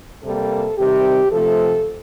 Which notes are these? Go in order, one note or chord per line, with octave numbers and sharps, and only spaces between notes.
C3 G3 A#3 A4
C3 D#3 G3 C4 G4
C3 F3 A3 A4